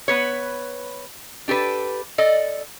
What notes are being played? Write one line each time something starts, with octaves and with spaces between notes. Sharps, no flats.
B3 B4 C#5
D4 G4 A4 B4
A4 D5 D#5